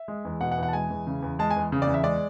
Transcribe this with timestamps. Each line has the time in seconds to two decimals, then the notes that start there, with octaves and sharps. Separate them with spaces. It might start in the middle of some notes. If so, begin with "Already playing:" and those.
Already playing: E5
0.08 G#3
0.25 E2
0.41 B2 F#5
0.51 F#5
0.58 E2
0.63 F#5
0.68 A5
0.73 G#3 G#5
0.90 E2
1.07 C#3
1.22 E2
1.39 G#3 A5
1.51 G#5
1.56 E2
1.72 C#3
1.82 D5
1.87 E2
1.94 E5
2.04 G#3 D5